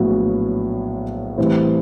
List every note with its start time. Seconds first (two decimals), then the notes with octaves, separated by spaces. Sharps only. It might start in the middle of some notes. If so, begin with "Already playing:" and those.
Already playing: A#1 A2 F#3 B3
1.38 A2 E3 G3 C4 E4